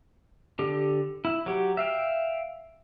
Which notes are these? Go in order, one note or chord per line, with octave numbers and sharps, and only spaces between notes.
D3 G4
E4
F#3 G4
E5 F5 G5